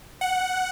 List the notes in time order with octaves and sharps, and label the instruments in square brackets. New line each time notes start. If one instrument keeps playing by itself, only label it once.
[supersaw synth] F#5